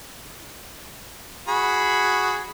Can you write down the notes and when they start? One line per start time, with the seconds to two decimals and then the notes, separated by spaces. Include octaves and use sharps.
1.48 F#4 G#4 B5